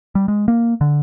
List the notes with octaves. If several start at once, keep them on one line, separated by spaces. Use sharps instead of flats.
G3
G#3
A#3
D3